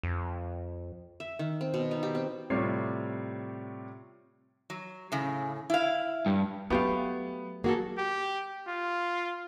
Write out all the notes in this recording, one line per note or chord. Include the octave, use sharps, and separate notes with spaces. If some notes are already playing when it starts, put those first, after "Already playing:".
F2
E5
D#3
C4
B2
D#4
G4
C4
A2 C3 G3 F4 C#5 C7
F#3
A2 C#3
E4 F5
G2
F#3 A3 B3 G4 F5
A#3 F#4 G#4 A4
G4
F4